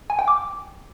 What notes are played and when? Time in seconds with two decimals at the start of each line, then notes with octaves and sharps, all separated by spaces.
0.10 G#5
0.19 G5
0.28 D6